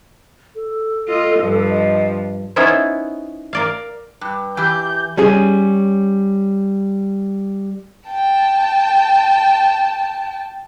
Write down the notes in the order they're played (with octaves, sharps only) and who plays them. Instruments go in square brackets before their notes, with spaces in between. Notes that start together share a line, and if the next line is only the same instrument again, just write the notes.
[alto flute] A4
[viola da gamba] F4 D#5
G2 F3
[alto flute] D#5
[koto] B3 C#4 D#4 E4 C5
A#4 D5 F5
[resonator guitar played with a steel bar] G2
[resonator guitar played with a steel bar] E3 G4 [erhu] G6
[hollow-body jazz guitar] G3 C#4 G#4
[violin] G5 A5